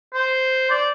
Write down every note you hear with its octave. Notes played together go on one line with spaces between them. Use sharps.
C5
D5